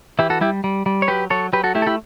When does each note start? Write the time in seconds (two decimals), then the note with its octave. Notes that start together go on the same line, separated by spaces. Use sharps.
0.19 E3 E4 G4
0.30 F#4 A4
0.41 G3 E4 G4
0.64 G3
0.86 G3
1.02 C#5
1.08 F#3 G4 B4
1.30 F#3 A4 C#5
1.53 F#3 G4 B4
1.64 F#4 A4
1.75 A3 E4 G4
1.82 A4
1.86 E4 G4